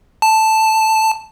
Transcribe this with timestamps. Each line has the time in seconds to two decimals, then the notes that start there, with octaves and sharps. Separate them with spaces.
0.22 A5